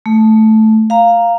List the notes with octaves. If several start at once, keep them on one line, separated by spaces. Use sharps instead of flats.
A3
F5 A#5